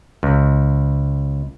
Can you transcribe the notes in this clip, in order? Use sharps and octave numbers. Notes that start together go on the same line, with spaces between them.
C#2